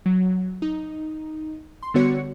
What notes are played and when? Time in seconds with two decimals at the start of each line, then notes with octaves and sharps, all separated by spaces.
0.06 F#3
0.62 D#4
1.83 C6
1.94 D3 G3 B3 F#4 C#5 C#7